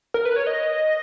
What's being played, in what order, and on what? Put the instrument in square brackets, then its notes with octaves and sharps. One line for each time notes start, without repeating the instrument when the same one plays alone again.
[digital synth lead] A#4
B4
C#5
D#5